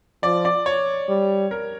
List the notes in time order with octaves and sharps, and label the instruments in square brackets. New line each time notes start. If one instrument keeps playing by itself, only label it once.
[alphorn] F3 [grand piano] D5
[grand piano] D5
C#5
[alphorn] G3
[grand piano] A#4